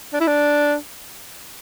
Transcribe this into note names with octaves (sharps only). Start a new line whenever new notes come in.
D4
E4
D4